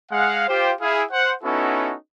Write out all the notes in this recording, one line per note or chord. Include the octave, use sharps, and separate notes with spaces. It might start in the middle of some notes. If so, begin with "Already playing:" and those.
G#3 F5 F#5
F4 G4 C5
E4 G#4 F5
C5 F#5
B3 C#4 D#4 E4 F#4 A4